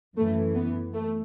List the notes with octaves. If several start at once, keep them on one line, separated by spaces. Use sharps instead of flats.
F#2 E3 A3
B3
A3